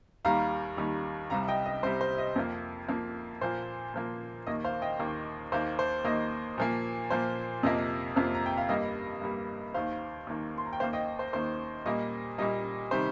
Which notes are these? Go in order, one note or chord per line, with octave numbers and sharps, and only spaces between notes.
D#2 D#3 G3 F5 A#5
D#2 D#3 G3
C2 C3 G3 F5 A#5
D#5 G5
D#5
C2 C3 G3 C5
C5
D#5
F2 F3 A#3
F2 F3 A#3
A#2 F3 A#3 C5
A#2 F3 A#3
D#2 D#3 A#3 D#5
C5 F5
D#5 G5
D#2 D#3 A#3
D#2 D#3 A#3 C5 F5
C5
D#2 D#3 A#3 D#5
A#2 F3 A#3
A#2 F3 A#3 C5
F2 C3 F3 A#3 D#5
F2 C3 F3 A#3
A#5
G5
F5
G2 G3 A#3 D#5
G2 G3 A#3
D#2 D#3 A#3 C5 F5
D#2 D#3 A#3
C6
A#5
G5
D#2 D#3 A#3 C5 F5
D#5 G5
C5
D#2 D#3 A#3 C5
A#2 G3 A#3 D#5
A#2 G3 A#3 D#5
C3 D#3 G3 C5